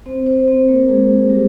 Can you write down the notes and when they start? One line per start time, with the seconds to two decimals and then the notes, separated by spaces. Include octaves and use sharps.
0.06 C4 C5
0.26 C4 C5
0.48 C4 C5
0.68 A#3 A#4
0.89 G#3 G#4
1.29 G3 G4